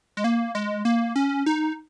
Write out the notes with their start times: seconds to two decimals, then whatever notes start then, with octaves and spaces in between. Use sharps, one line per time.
0.17 G#3
0.24 A#3
0.55 G#3
0.85 A#3
1.16 C#4
1.46 D#4